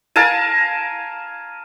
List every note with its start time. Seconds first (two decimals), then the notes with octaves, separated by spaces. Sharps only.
0.16 A#4 F5 G#5 A5